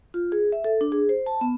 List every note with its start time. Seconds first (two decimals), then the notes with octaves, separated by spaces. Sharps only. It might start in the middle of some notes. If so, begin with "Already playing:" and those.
0.14 F4
0.32 G#4
0.52 E5
0.64 A4
0.81 D4
0.92 G#4
1.09 C5
1.26 A5
1.41 B3